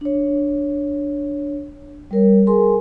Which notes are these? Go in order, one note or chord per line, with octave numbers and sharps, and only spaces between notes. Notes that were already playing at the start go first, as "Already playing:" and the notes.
D4 C#5
G3 A#4 C#5
G#4 A#4 G#5 C6